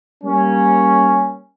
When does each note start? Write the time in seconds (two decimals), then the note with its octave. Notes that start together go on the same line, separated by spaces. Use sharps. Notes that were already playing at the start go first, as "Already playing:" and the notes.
0.24 G3 A#3 C#4